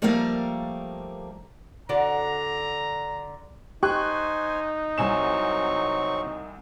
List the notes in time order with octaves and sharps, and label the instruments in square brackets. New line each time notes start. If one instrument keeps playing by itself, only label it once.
[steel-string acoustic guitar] F3 G3 A3 A#3 A#4 F5
[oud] D3 F#4 D5 [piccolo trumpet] A#5
[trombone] D#4 [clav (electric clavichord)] G4 [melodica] C5 G#5 [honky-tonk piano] C#6 F#6
[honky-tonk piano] C2 G#5 E7 [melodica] F#3 C4 C#6